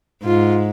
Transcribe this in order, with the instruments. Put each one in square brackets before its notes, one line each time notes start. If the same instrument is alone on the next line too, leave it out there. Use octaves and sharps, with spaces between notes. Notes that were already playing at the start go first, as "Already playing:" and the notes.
[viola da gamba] G#2 [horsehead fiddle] F4